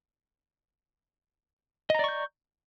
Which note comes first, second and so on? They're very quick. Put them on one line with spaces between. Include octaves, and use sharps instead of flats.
D#5 A#5 D5 C#6 G6